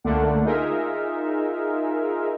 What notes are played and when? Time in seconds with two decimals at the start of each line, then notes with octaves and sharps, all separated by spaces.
0.04 C#2 D3 A3 A#3 D4 F#5
0.45 D#4 F4 G#4 A#4 E5